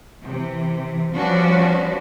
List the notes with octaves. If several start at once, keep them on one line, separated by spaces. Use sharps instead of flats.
C3 E3
F3 G3 B3 C#4 D4 F#4